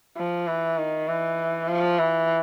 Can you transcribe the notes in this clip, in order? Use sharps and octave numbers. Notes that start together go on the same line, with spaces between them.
F3
E3
D#3
E3
F3
E3